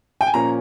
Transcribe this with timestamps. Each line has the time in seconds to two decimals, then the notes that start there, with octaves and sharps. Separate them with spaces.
0.21 G5
0.27 G#5
0.34 A#2 F3 A#3 C#4 A#5